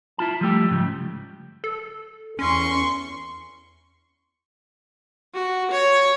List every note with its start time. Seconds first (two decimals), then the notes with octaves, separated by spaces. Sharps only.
0.18 E4 F4 A5
0.41 F3 G3 A3 G4
0.71 G#2 C#3 E3 F3
1.64 A4
2.39 E2 C#4 C6 C#6
5.34 F#4
5.71 C#5